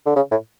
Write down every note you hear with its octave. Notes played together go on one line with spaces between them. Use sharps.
D3
C#3
A2